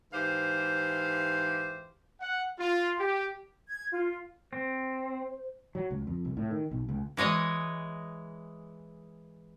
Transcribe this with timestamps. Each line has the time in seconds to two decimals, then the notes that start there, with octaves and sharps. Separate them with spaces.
0.12 G#2 E3 G4 C5 F5
2.21 F#5
2.59 F4
2.99 G4
3.68 G#6
3.91 F4
4.53 C4 C5
5.75 F#3
5.91 C#2
6.07 F2
6.25 C2
6.37 A2
6.51 D#3
6.71 B1
6.89 C#2
7.17 E3 G#3 C#5 D#5